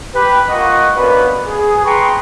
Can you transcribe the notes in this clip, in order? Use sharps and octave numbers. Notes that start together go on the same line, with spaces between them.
G4 B4
A#3 F4 D#5 F#5 C#6
A#3 B3 C#4 D4 F#4 B4
G#4
B4 G5 A#5 C6 C#6